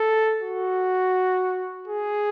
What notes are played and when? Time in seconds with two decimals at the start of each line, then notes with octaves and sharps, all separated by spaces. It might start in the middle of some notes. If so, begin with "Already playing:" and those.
Already playing: A4
0.42 F#4
1.88 G#4